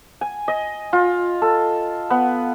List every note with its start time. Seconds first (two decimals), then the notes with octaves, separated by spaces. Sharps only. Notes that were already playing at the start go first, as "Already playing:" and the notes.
0.21 G#5
0.48 D#5
0.93 F4
1.42 A4
2.10 B3